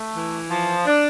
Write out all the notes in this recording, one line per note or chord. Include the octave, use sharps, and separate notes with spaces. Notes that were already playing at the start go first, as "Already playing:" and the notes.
Already playing: A3
E3
F3
D4